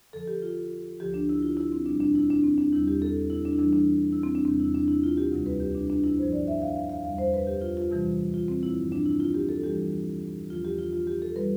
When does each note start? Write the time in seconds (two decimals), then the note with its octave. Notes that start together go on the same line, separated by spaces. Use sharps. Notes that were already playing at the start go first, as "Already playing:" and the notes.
0.13 F2 D3 F3 A4
0.27 G4
0.42 F4
1.00 D2 D3 F3 G4
1.14 D4
1.29 E4
1.43 F4
1.57 E4
1.72 C4
1.86 E2 B2 G3 D4
2.00 D4
2.15 E4
2.30 D4
2.44 C4
2.58 D4
2.72 E2 D3 G3 E4
2.88 G4
3.02 A4
3.30 E4
3.45 D4
3.53 E4
3.58 F2 E3 G3 D4
3.73 D4
4.13 E4
4.23 C4
4.35 D4
4.45 E2 C3 G3 C4
4.60 E4
4.74 D4
4.88 E4
5.04 F4
5.17 G4
5.32 D2 C3 G3
5.46 B4
5.60 G4
5.75 D4
5.90 D4
6.04 E4
6.17 G2 F3 C5
6.32 D5
6.47 E5
6.62 F5
6.76 F5
6.89 F5
7.04 E2 D3 G3 F5
7.18 C5
7.34 B4
7.47 G4
7.61 F4
7.77 F4
7.91 F2 C3 E3 G3
8.34 F4
8.48 C4
8.63 E4
8.77 G2 F3
8.92 D4
9.06 E4
9.20 F4
9.34 G4
9.49 A4
9.63 F2 E3 G3 G4
10.49 E2 D3 F3 F4
10.64 G4
10.79 F4
10.93 F4
11.07 G4
11.22 A4
11.36 E3 G3 B4